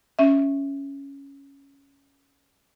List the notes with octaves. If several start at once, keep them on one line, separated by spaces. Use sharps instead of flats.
C#4 E5